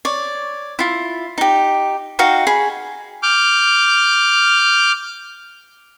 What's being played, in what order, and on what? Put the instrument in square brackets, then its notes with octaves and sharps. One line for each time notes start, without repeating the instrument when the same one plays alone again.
[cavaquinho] C#5 D5
E4 F4
D#4 G4
D#4 F#4 F5 G5
G#4 B5
[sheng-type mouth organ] D6 F6 G6